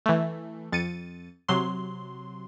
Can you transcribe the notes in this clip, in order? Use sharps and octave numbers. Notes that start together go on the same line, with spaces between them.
E3 A3
F2 A6 C#7 D#7
C3 F#3 C6